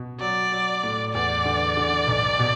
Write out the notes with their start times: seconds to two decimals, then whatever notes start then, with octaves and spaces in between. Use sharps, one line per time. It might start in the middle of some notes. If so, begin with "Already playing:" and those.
Already playing: B2
0.20 F#3 D5
0.52 F#3
0.83 A2
1.13 E2 D5
1.45 D3
1.77 D3
2.07 B1
2.39 B2